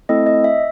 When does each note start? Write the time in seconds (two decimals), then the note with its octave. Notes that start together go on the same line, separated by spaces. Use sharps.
0.09 A3 C4 E4 A4 D#5
0.26 D#5
0.44 E5